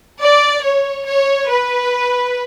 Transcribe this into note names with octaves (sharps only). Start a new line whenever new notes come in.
D5
C#5
C#5
B4